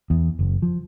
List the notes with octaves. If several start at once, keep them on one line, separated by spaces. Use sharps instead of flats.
E2
F#1
F3